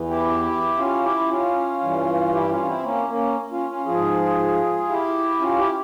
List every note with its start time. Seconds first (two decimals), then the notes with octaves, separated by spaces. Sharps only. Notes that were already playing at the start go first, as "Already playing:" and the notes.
Already playing: E2 E3
0.09 E4 G4
0.77 C#4 F4
1.03 E4 G4
1.28 C#4 F4
1.80 G2 E3
2.32 E4 G4
2.49 C#4 F4
2.66 C4 E4
2.83 A#3 C#4
3.08 A#3 C#4
3.52 C#4 F4
3.69 C#4 F4
3.86 G#2 F3 F4 G#4
4.89 E4 G4
5.40 C#4 F4
5.58 E4 G4